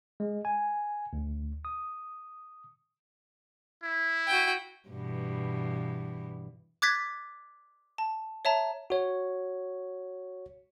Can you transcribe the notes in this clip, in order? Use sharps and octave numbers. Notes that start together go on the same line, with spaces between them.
G#3
G#5
D2
D#6
E4
F#4 G5
G2 B2 E3
D6 F#6 G#6 A6 B6
A5
C#5 E5 A5 A#5
F#4 C#5